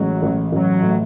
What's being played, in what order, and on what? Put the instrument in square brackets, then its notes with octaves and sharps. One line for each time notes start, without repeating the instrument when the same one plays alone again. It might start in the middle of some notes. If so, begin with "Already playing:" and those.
Already playing: [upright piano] A1 G#3 [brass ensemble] F#3
[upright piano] A1
[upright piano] A1 [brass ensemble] F#3
[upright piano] A2